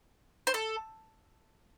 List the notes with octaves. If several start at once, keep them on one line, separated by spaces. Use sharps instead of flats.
C5
A4